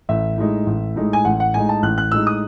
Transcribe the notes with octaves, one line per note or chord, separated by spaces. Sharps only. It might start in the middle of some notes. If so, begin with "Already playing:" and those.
A1 E5
A2 G#3 D#4
A1
A2 G#3 D#4
G#5
A1 F#5
F#5
A2 G#3 D#4 G#5
A5
A1 F#6
F#6
A2 G#3 D#4 E6
D#6